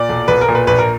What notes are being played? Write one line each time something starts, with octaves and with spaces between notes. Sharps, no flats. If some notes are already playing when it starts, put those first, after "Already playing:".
Already playing: A#2 D5
B1
B1 B4
A#4
A#2
B4
A#1 B4
A#4